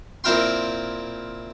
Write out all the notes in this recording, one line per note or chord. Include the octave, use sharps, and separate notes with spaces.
A#2 C4 E4 A#4 G5 C6